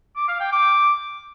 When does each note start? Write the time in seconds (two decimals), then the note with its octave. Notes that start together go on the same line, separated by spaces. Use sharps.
0.16 D6
0.28 F5
0.40 G5
0.52 D6